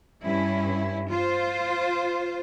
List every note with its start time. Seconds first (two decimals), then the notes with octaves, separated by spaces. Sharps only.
0.23 G2 C#4 E4
1.09 F4 C5